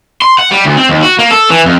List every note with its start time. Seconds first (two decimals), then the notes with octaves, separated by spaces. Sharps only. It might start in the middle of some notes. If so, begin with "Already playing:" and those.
0.22 C6
0.39 F#5
0.52 G3
0.65 D2
0.78 C4
0.89 D#2
1.03 F#4
1.19 A#3
1.31 A4
1.50 E3
1.65 F2